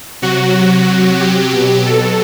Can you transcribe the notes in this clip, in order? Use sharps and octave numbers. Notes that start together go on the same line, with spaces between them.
C3 F#3 F#4
G4
B2 F#3
A4